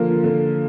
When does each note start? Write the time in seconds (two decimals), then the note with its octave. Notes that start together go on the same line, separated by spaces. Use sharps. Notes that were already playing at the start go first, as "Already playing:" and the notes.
Already playing: D3 F3 A#3
0.24 D3